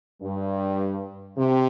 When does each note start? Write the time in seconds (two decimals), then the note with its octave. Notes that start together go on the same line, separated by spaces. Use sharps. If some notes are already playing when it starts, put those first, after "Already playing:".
0.22 G2
1.38 C3